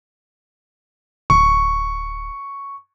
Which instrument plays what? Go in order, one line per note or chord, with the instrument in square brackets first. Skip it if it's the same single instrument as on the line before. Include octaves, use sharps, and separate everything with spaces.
[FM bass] D1 [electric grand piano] C#6